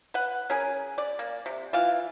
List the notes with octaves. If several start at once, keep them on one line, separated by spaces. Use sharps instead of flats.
B4 F#5
C#4 G#4 A#4 G#5
D5
A#3
C3
E3 F4 F5